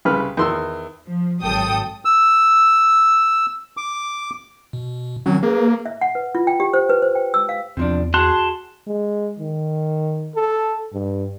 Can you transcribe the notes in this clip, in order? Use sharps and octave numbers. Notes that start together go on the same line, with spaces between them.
C2 C#3 B4 F6
E2 D#3 C6 E6
F3
G#1 F#3 A4 G5 D#6
E6
D6
B2
D#3 F#3 C4 C#4
A#3 G#4 B4
E5
F#5
B4
F4
G5
G4
C5
B4
C5
G5
E6
F5
E2 C3 F3 D4
F#4 G#4 A5 C6 F#6
G#3
D#3
A4
G2